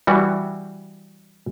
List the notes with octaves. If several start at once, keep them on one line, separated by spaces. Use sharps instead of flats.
E3 G3 F#4